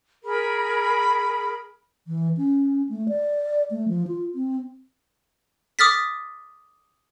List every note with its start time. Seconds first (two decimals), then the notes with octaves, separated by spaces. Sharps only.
0.23 G#4 A#4 B5
2.07 E3
2.37 C#4
2.89 A3
3.08 D5
3.71 A3
3.88 F3
4.07 F4
4.35 C4
5.79 D6 D#6 F6 A6 B6